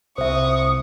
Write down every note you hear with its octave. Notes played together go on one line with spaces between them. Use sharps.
C2 C5 E5 C#6 D#6